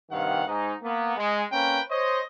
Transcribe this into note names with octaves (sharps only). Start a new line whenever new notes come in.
G2 C3 D#3 F5 F#5
G#2 D#4
A#3 B3
G#3
A#3 C4 C#4 A#4 B4 G5
C5 C#5 D#5